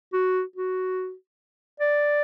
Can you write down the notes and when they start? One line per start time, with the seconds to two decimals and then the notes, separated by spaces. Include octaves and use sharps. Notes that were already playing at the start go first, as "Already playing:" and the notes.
0.13 F#4
0.56 F#4
1.80 D5